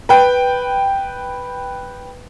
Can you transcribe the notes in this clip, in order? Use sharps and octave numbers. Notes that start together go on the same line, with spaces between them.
B4 G5